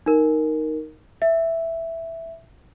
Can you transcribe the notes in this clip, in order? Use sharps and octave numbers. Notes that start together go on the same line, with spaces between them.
D#4 A#4
E5